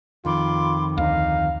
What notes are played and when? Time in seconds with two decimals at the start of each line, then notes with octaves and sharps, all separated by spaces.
0.25 F2 D#3 F4 B5 C6 D6
0.98 D2 D#4 F5